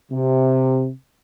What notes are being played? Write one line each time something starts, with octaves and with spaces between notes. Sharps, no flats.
C3